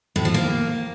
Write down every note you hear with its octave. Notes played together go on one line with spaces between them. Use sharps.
A2
F3
A#3